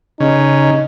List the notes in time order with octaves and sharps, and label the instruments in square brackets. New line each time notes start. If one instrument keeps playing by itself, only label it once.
[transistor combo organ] C#3 [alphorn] D#4